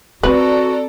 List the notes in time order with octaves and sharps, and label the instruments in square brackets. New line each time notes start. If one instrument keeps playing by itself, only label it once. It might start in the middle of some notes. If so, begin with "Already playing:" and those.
[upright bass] C4 [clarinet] F#4 [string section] A4 D5 A#5 [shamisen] B4